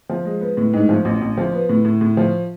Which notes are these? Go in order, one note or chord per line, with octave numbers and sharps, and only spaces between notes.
F3
G#3
B3
A2
G#2
F3
A1
A1
F3
B3
A2
A2
A2
F3